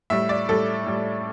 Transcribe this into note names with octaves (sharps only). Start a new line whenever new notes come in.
A2 G3 E5
D5
A2 G3 A4
A2 G3